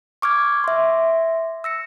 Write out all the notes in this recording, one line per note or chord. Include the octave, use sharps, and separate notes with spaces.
C#6 D6 F6 G#6
E5 C6
E6 A#6 C#7